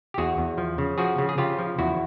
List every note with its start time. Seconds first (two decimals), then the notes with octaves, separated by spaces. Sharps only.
0.14 G4
0.18 E2 F#4 G#4
0.38 E2
0.58 F3
0.78 C#3
0.98 F3 F#4 G#4
1.18 C#3
1.29 G#4
1.38 C#3 F4 G4
1.59 F3
1.79 E2 E4 F#4